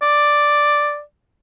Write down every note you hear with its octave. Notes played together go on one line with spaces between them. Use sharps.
D5